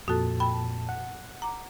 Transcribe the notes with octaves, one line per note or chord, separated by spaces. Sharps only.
F2 A#2 F#4 A4 A5
G5 B5
F#5
A#5 D6